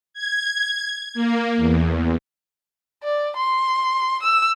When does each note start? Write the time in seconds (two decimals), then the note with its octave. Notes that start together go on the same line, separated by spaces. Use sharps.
0.14 G#6
1.14 A#3
1.57 E2
3.04 D5
3.36 C6
4.23 E6